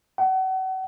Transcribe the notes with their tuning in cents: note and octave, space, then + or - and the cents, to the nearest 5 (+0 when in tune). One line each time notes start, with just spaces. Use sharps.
F#5 +35